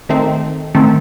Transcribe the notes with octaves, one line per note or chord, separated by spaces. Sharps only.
D#3 A3 C4
D#3 A3 C4